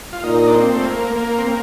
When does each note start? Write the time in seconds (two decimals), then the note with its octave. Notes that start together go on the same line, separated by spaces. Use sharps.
0.13 F4
0.23 A#2 D#4
0.47 D4
0.54 C4
0.74 A3
0.86 A#3
1.16 A#3
1.38 C4
1.46 A#3